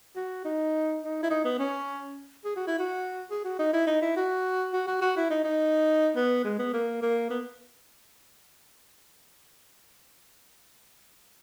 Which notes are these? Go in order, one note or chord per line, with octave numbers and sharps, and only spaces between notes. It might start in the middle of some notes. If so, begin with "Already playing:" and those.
F#4
D#4
D#4
E4
D#4
B3
C#4
G#4
F#4
E4
F#4
G#4
F#4
D#4
E4
D#4
E4
F#4
F#4
F#4
F#4
E4
D#4
D#4
B3
G#3
B3
A#3
A#3
B3